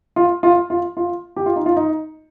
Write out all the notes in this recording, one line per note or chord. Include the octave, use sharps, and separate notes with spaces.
F4
F4
F4
F4
G4
F4
D#4
F4
D#4